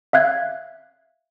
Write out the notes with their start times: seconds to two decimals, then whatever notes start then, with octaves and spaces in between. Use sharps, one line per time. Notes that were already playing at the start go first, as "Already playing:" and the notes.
0.13 E5 F5 F#6 G#6